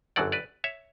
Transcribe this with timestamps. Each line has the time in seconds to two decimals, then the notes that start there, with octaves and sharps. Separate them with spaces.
0.16 G1 F#2 D3 F#3 D5 F#5
0.32 B4 D5
0.64 C#5 E5